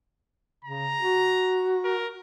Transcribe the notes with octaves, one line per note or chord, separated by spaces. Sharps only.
C#3 A#5
F#4
A#4